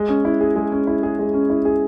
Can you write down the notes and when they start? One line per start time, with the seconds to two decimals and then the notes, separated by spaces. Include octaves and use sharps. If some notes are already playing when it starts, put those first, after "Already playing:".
Already playing: G#3
0.09 C#4
0.25 E4
0.41 G#4
0.56 G#3
0.72 C#4
0.87 E4
1.03 G#4
1.19 G#3
1.34 C#4
1.50 E4
1.65 G#4